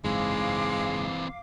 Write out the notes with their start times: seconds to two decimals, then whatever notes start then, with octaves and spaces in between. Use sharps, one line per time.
0.04 F#1 G#2 E3 G#3 C4 F5 D6